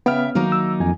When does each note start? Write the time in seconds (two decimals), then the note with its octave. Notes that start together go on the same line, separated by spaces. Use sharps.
0.06 C#3 B3 E5 G5 F6
0.35 D#3 F#3 A#3 D#4
0.52 E6
0.80 F2 G#5